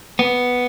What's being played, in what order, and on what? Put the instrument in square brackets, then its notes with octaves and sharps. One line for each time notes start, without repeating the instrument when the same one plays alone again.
[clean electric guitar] B3